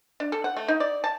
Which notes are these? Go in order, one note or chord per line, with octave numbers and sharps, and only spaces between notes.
D4
A4
F#5
A3
D#4
D5
A5